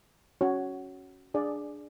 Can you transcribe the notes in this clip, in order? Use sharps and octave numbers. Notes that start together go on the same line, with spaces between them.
C#4 F#4 C#5
D4 G#4 D5 F5